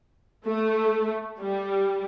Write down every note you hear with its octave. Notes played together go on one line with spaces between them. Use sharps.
A3
G3